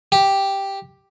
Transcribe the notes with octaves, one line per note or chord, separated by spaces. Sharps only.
G4